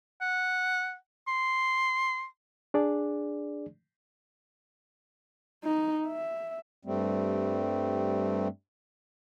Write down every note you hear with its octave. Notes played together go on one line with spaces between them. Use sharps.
F#5
C6
D4 G#4 D5
D#4
E5
G2 G3 A3 C4